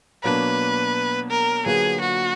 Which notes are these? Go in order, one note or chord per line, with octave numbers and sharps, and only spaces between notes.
B2 F#3 A#3 D4 B4
A#4
D3 F#3 A#3 F4 G#4 B4
F#4